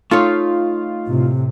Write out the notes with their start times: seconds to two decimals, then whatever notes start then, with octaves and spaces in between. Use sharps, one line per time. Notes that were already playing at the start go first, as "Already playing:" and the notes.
0.11 A3 D#4 F4 C#5
1.07 A2 C3